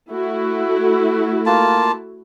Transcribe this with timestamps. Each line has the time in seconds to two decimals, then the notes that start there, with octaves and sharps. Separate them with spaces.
0.10 A3 E4 F#4
1.46 A#3 F4 A5